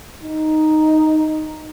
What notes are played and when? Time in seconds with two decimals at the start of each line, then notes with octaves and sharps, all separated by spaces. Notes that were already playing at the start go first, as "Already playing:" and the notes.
0.23 D#4